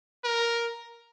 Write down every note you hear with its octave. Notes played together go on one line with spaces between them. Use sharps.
A#4